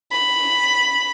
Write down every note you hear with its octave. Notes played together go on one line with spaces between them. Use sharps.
B5